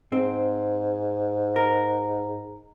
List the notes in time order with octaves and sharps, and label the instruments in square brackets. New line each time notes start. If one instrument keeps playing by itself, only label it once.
[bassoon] G#2 [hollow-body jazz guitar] C4
[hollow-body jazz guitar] A#4